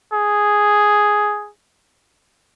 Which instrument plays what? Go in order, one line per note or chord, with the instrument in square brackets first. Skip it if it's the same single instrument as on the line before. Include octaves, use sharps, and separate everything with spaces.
[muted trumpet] G#4